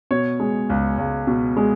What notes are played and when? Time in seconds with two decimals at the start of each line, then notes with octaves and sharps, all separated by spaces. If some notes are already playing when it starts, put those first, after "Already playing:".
0.11 B2 C#5
0.40 G#3
0.70 C#2
0.98 C#2
1.27 B2
1.57 G#3